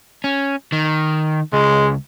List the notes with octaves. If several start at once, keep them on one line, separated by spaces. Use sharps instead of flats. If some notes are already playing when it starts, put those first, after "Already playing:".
C#4
D#3
C#2 G#3